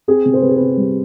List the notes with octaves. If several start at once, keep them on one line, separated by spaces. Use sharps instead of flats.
C4 G#4
C3
C5
C3 B4
G#4
C3 B4
G3